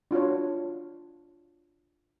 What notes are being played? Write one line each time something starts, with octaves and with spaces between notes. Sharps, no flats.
D4 F4 F#4 C#5